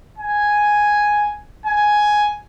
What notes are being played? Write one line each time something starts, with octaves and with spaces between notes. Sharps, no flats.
G#5
G#5